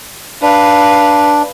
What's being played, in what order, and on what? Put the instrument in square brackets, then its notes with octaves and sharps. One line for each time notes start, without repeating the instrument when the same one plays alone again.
[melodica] D4 [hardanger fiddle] B4 F5